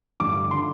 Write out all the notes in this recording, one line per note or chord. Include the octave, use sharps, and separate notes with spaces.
A1 G2 D3 D6
D3 C6